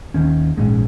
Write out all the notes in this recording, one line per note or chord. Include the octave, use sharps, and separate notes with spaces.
D#2 D#3 C#4
A#1 G#2 G#3 C#4